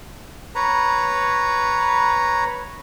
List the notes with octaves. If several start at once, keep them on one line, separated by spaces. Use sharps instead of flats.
B4 C#5 A#5